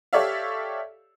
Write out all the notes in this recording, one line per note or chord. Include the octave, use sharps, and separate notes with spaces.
G4 A4 C#5 D5 E5 F5